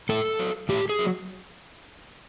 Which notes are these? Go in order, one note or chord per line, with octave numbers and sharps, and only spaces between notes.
A2 A4
F#3
A2 G4
G#4
F#3